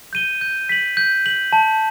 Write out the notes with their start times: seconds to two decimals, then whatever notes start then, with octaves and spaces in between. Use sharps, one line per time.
0.13 G6 D#7 G7
0.41 G6
0.69 B6 F#7
0.97 G6
1.25 B6 F#7
1.53 A5